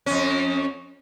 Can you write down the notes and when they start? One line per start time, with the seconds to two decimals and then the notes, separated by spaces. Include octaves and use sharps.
0.06 F2 C#4